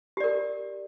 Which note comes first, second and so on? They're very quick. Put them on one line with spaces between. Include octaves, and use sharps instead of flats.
G4 D5 A#4